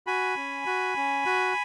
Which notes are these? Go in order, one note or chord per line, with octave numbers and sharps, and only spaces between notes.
F#4 G#5 B5
C#4
F#4
C#4
F#4